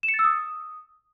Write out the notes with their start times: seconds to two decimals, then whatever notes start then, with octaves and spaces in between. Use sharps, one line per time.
0.03 E7
0.08 C#7
0.14 A6
0.19 E6
0.24 D#6